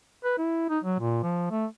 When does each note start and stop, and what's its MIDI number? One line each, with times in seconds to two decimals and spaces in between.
0.24 0.35 71
0.38 0.68 64
0.70 0.79 63
0.84 0.99 54
1.00 1.23 46
1.23 1.49 53
1.51 1.66 57